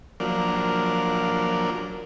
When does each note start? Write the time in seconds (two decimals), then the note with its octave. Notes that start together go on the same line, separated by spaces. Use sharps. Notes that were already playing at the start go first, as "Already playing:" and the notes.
0.20 F3 F#3 A#3 D4 A#4 D5